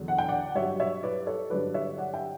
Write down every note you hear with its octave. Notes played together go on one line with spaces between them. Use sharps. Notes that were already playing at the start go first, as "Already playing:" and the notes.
Already playing: E2 D3 F#3
F#5
G5
D5 F#5
G2 F#3 C#5 E5
C#5 E5
B4 D5
A4 C#5
G2 D3 F#3 B4 D5
C#5 E5
D5 F#5
E5 G5